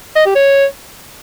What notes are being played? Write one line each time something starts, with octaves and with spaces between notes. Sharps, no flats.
D#5
G4
C#5